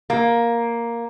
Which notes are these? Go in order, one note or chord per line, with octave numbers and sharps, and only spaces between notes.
A#3